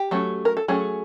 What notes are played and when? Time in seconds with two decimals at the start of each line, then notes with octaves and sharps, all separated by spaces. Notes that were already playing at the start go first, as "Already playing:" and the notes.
Already playing: G4
0.11 F#3 A3 C#4
0.45 A#4
0.57 A4
0.68 F#3 A3 C#4 G#4